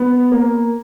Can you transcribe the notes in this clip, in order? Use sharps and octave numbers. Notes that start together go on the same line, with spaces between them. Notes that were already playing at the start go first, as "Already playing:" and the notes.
Already playing: B3
A#3